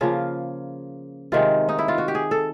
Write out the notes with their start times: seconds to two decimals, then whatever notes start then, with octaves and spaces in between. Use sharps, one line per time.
0.01 C#3 F3 A#3 F4
1.32 C3 D#3 G#3 F4
1.69 D#4
1.79 E4
1.88 F4
1.98 F#4
2.08 G4
2.15 G#4
2.31 A4